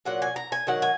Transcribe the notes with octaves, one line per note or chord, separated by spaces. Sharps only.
A#2 F#3 F#5
G#5
A#5
G#5
D#3 F#3 F#5
G#5